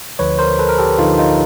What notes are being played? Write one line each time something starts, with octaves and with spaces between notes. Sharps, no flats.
D2 D3 F3 B4 C#5
A#4 C5
A4 B4
A#4
G4 A4
D2 D3 F3 D#4 F4
D#4 F4